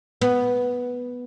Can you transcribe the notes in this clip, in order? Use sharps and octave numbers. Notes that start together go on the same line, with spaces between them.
B3